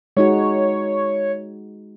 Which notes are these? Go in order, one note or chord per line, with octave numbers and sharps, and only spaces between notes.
G#3 D#4 F#4 C#5